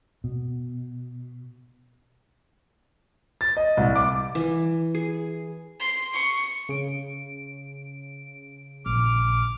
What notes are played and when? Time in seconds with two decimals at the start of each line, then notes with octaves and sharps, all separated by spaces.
0.24 B2
3.41 A6
3.57 D#5
3.77 C2
3.96 D6
4.35 E3
4.94 G#4
5.80 C6
6.14 C#6
6.69 C#3 D7
8.86 A#1 D6 F6